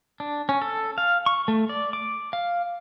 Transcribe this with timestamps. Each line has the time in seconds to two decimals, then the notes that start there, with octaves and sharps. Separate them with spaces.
0.20 D4
0.49 C#4
0.62 A4
0.98 F5
1.26 C#6
1.48 A3
1.69 D5
1.93 D6
2.33 F5